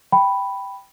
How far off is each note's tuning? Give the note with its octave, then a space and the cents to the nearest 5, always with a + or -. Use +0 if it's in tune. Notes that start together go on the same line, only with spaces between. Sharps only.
G5 +0 B5 +0